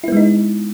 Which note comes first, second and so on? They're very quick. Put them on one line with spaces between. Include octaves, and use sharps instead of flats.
E4 B3 G#3 D#4